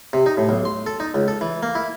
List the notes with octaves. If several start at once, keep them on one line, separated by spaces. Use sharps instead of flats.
C3
D#4
A2
B1
C6
A4
D#4
C#2
A4
E3
A#3
E4